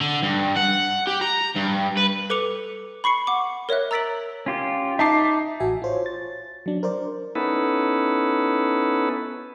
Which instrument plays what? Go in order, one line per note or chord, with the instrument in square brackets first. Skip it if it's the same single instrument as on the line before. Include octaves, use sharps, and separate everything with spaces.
[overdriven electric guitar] D3
G2
F#5
G4
A#5
G2
B4
[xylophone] A4 B4 D6 C#7 F7
B5 C#6 C7 C#7
F#5 D6
A#4 C#5 D#5 E5 F#6
A#5 E6 A6 B6 D7 F#7
[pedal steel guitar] C#4 F4 G4
[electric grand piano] D#4 A5 C7 [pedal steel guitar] E5 D6
[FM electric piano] A1 F#4 E5 G#5
F4 C5 C#5
A6
F#3 D4
A#4 C5 D5
[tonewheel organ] B3 C#4 D#4 E4 A4 B4